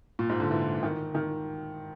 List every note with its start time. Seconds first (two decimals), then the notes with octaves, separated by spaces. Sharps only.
0.19 A#2
0.29 G#2
0.40 D3
0.51 E3
0.83 D#3
1.15 D#3